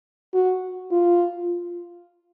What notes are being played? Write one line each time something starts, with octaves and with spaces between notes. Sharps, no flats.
F#4
F4